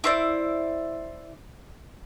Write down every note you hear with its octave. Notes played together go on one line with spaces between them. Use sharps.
E4 C5 D5